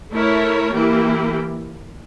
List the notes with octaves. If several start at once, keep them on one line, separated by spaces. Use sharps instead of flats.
A3 E4 A#4 C#5
E3 A#3 E4 G4